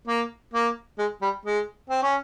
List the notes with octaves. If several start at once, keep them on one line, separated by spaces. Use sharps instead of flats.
A#3
A#3
G#3
G3
G#3
C4
C#4